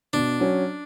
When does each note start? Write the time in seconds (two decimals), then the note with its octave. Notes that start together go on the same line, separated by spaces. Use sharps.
0.13 B2 D4
0.40 F#3 C#4